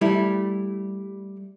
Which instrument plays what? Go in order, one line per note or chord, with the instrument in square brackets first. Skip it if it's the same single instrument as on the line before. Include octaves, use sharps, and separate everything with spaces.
[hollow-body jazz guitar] G3 A3 E4